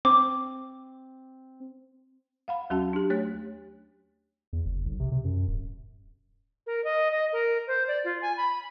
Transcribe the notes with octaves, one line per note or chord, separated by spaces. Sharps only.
C4 D6
F5 F#5 B5
D#2 F#3 C#4 F#4 F#5 A5
D4 G4
A3 C#5 F#6
E2
F#1
B1
C3
C3
F#2
D1
A#4
D#5
D#5
A#4
C5
D5
F4
G#5
B5